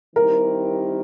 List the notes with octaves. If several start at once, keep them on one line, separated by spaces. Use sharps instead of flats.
D#3 G3 C4 E4 G4 A#4